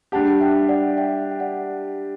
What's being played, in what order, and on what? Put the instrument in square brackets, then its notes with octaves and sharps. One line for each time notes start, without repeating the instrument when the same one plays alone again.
[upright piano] G3 D4 G4 [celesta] F#5 A5
[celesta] E5 G5
D5 F#5
E5 G5
G5
D5 F#5